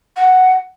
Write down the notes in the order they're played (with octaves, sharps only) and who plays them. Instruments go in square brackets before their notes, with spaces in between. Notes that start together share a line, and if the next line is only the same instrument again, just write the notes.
[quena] F#5